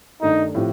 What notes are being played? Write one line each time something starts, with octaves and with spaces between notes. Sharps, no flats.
G2 D#3 A3 D4 D#4
A2 F3 C4 G4